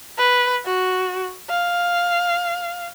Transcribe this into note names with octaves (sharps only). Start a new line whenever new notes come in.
B4
F#4
F5